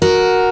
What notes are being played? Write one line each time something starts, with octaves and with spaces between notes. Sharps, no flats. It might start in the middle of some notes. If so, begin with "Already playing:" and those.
F#4 A#4